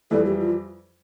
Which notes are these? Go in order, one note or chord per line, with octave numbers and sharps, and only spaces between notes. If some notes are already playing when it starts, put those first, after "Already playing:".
F2 E3 G3 A4
G4
F4